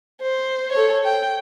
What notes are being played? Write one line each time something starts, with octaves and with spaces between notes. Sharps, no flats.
C5
A4 C#5
G5